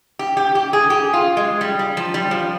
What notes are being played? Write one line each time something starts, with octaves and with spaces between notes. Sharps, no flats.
G4
G4
G4
G#4
G4
F4
G#3
G3
G3
F3
G3
F3